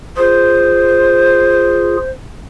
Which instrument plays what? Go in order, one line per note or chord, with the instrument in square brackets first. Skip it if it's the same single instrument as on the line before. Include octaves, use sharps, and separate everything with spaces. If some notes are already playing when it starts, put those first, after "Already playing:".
[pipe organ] F4 G#4 [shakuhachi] C5